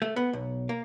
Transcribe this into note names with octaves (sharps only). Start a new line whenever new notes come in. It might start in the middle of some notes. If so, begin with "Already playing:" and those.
A3
B3
B1
A#3